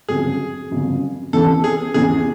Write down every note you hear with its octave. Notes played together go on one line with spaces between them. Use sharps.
G1 F2 C#3 F#3 G#4
G1 F2 C#3 F#3
E2 C3 E3 A4
G#4
E2 C3 E3 G#4